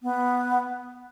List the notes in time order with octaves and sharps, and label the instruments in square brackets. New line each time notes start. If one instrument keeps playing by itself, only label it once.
[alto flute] B3